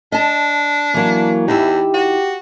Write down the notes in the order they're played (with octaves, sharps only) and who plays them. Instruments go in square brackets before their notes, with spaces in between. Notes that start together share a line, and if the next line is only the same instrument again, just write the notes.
[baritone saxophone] D4 [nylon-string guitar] D#5 A5
[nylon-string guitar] E3 F#3 [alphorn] A#3
[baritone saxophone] E2 [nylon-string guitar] D#4 E4 [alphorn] G4
[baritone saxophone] F#4